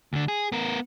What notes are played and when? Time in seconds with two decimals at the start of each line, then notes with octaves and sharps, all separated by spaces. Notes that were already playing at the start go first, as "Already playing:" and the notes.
0.13 D2 D3
0.28 G#4
0.52 B3 A#4